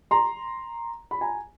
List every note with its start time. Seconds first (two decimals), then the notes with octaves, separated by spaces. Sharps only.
0.11 A#5 C6
1.11 B5
1.21 G#5 A#5